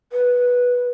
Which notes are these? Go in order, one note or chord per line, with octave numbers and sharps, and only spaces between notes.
B4